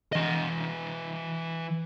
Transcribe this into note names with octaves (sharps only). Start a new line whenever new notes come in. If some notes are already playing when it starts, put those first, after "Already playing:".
E3 D#5